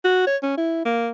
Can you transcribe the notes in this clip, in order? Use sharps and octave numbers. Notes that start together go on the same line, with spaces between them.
F#4
C#5
C#4
E4
A#3